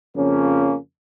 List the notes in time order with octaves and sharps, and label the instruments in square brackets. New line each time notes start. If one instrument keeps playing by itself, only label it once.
[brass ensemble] F2 C#3 F3 A#3 C#4